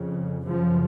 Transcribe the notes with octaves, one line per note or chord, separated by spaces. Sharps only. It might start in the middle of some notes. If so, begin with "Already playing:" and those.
Already playing: F2 C#3
F#2 C#3 F3